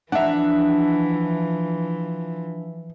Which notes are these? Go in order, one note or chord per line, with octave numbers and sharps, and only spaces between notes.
E3 F3 D4 E5 F#5 A#5